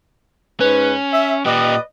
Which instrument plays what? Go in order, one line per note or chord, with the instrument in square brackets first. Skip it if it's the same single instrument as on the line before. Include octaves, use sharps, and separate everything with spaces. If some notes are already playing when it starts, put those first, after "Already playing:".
[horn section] G#2 B4 [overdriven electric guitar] C#4
[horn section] E5
[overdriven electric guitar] A#2 G4 [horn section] B4 D5 D#5